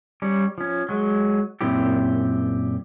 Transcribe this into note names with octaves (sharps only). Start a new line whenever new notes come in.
G3 C#4
F3 C#4
F#3 G#3
F#2 A#2 C4 E4 G4